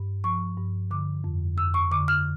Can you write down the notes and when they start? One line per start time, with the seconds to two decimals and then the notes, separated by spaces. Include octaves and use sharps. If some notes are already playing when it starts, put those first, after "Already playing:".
Already playing: G2
0.24 F3 C#6
0.57 G2
0.91 D3 D6
1.24 F2
1.58 F2 E6
1.74 C#6
1.91 D3 D6
2.08 F6